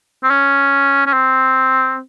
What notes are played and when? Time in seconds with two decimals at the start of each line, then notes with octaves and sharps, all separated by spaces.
0.23 C4
0.30 C#4
1.06 C#4
1.13 C4